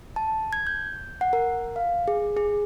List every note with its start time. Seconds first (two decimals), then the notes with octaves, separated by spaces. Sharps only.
0.16 A5
0.53 G#6
0.67 G6
1.21 F#5
1.33 A#4
1.76 F5
2.08 G#4
2.37 G#4